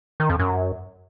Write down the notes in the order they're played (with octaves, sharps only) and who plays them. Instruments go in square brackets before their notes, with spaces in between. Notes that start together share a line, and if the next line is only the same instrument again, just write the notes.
[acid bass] D#3
F2
F#2